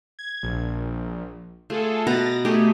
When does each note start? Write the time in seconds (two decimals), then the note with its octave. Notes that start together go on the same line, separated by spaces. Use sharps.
0.19 G#6
0.43 A#1
1.70 A3 F4 G#4 A4
2.07 B2 B4 A#5 A6 A#6
2.45 A3 G4 G#4